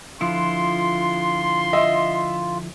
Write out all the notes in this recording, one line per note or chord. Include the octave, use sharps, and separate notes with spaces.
D3 F3 E4 F4 C6
D#5 E5